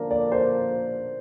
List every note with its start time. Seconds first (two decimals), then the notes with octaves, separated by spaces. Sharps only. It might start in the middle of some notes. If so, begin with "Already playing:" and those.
Already playing: D3 F3 A#3 D4 A#4
0.11 D5
0.32 C5